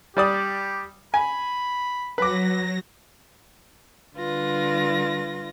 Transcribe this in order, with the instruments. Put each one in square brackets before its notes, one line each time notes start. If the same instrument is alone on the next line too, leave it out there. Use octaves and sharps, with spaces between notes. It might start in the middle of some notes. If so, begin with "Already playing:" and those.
[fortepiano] G3 D5 D#6 [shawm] G4
[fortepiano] G#5 [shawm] B5
[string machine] F#3 A#6 [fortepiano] B4 D6
[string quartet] D3 G3 F4 B4 A#6